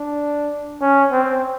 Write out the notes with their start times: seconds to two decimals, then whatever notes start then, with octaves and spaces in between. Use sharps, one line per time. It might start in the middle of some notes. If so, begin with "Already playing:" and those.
Already playing: D4
0.81 C#4
1.12 C4